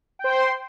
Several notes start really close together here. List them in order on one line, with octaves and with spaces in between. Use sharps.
G5 C5 C6